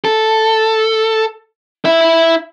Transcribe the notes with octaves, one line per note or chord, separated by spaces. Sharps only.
A4
E4 E5